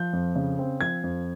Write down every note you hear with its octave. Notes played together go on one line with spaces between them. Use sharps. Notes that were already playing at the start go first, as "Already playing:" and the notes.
Already playing: F3 G6
F2
C#3
C4
F3 G#6
F2